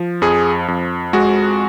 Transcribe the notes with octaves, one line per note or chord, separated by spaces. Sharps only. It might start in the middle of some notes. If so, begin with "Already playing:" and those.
Already playing: F3
F2 G#4
F2
G#3 F#4